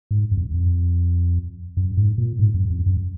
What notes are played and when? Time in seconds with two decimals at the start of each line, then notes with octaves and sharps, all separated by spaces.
0.11 G#2
0.31 F#2
0.37 F2
0.52 F2
1.77 F#2
1.97 G#2
2.18 A#2
2.39 G#2
2.54 F#2
2.70 F2
2.86 F#2